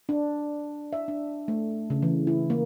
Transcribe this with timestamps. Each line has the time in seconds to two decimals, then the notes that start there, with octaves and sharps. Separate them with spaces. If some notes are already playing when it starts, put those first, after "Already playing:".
0.09 D4
0.93 E5
1.08 D4
1.48 A3
1.90 C#3
2.02 E3
2.27 E4
2.50 A#3